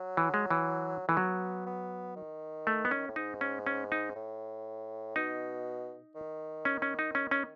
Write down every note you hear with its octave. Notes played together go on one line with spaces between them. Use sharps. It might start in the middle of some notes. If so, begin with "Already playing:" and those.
Already playing: F#3
E3
G#3
E3
E3 A3
F#3 B3
B3
D#3
A3
B3
C#4
A2
G#2 D#4
C#4
C#4
D#4
A2
B2 D#4
D#3
C#4
C#4
D#4
C#4
C#4